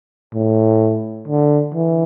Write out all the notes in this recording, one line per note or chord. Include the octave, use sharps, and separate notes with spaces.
A2
D3
E3